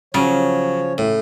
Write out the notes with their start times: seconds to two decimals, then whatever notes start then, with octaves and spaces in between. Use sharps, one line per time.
0.14 C#3 F3 F#3 C#5
0.98 A2